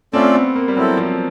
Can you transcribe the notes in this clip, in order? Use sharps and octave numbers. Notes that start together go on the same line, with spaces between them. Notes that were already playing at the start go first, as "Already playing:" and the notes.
A3 C4 C#4 F4 A4 D5
B3
A#3
G3
F#3 C4 E4 A4
F3